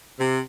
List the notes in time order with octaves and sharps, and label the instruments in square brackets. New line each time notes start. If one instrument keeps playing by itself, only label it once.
[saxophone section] C3